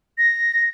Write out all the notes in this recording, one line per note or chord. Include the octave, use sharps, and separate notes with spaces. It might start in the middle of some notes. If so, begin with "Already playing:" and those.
A#6